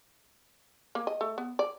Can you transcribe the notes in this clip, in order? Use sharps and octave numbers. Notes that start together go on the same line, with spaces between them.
A#3
D#5
A3
B3
D5